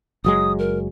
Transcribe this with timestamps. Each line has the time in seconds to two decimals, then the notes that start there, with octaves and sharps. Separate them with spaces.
0.24 F#1 F#3 G#3 D#6
0.59 A#4